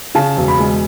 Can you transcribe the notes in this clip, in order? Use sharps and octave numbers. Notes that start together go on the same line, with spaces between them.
C#3 A5
E1
B5
G#3